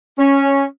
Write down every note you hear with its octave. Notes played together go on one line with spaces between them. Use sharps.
C#4